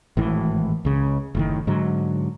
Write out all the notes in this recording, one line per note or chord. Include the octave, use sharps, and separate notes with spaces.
G#1 A2 E3
C#2 C#3
F#1 A2 D#3
G#2 D3 F#3